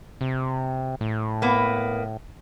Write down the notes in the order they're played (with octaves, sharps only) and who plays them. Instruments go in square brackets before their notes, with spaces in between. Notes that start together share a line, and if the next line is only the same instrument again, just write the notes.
[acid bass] C3
A2
[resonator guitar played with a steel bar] A#3 B3